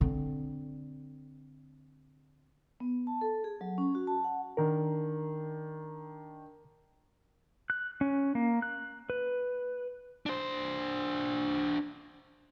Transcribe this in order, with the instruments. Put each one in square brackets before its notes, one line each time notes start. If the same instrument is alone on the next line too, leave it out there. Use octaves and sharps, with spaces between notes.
[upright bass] D3 C4
[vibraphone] B3
A5
A4
G#4
F#3
C#4
F#4
A5
F#5
[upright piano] D#3 D4 [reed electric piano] A#4
[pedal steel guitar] F#6
C#4
A#3
F#6
B4
[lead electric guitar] D4 C5